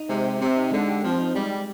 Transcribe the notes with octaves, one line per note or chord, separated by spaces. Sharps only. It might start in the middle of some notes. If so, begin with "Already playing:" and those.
Already playing: D#4
C3 G#3
G4
C3 C4
D#4
D3 G#3
G4
F3 C4
D#4
G3 G#3
G4